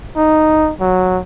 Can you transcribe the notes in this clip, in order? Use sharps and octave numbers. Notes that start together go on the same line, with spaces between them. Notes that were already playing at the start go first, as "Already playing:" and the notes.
D#4
F#3